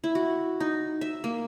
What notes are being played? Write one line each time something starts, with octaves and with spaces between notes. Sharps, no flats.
E4
F#4
D#4
E5
A#3